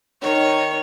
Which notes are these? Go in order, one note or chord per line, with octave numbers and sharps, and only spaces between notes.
D#3 C#5